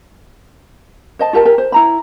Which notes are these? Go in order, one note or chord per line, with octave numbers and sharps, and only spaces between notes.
C5 D#5 A5
F4 G4 A#4 A5
G4 A#4 G#5
C5
E4 A#5 B5